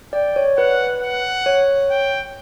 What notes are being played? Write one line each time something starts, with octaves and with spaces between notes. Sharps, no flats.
D5 G5
C#5
B4 F#5
F#5
C#5
G5